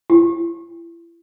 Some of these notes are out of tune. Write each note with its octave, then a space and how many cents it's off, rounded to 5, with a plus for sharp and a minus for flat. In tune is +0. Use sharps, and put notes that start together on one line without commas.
E4 +35